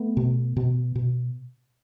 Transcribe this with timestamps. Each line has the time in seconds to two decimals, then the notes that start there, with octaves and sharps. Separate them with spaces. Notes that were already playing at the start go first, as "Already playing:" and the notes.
Already playing: A3 B3
0.17 B2
0.57 B2
0.96 B2